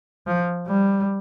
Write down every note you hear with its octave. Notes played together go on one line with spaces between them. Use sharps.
F3
G3